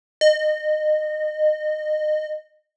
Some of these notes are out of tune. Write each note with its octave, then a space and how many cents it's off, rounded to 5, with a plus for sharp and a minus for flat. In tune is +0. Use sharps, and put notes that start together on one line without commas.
D#5 -25